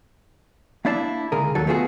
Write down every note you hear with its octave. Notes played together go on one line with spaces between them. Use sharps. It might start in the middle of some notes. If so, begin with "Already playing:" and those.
A#3 D4 E4 D5 F5 A5
C#2 D3 G#4 A#4
D#2 F#3 A4
A3 B3 F4 F#4 G#4